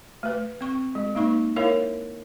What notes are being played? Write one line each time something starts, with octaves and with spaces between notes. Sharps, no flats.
A3 B4
C4 C#6
G#3
A#3 D#4 C#6
E4 A#4 C#5 E5 F5